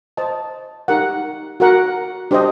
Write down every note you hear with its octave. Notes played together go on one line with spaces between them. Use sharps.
C5 D#5 A5
D#4 G4 A#4 F#5
F#4 A#4 F#5
D4 G4 C5 D#5